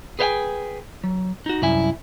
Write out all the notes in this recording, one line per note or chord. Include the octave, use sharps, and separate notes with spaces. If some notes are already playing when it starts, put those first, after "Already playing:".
G#4 B4 C5 F5 G5 G#5
F#3
D#4 F#4
C2 F#2 E4 G#5